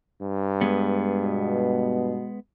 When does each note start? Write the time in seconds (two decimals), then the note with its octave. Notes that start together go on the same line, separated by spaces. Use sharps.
0.21 G2
0.61 G#3 B3
1.22 B2